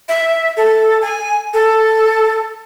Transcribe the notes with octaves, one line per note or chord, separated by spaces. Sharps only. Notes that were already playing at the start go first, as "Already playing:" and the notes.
E5
A4
G#5
A4